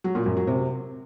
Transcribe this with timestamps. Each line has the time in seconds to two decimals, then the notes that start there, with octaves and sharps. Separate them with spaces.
0.04 F#3
0.15 A#2
0.26 F#2
0.37 F#3
0.47 C3